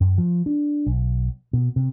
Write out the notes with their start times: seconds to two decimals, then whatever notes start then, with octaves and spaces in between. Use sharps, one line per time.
0.01 F#2
0.18 F3
0.46 D4
0.86 B1
1.53 B2
1.76 C3